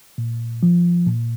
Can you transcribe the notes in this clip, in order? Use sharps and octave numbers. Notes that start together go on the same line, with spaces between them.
A#2
F3
A#2